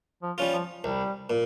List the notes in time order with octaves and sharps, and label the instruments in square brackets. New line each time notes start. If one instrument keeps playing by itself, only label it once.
[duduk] F3
[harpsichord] G3 C#4 F4
[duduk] F3
[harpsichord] C2 [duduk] G3
[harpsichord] A#2